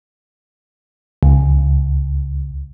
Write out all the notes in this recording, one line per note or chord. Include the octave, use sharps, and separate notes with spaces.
C#2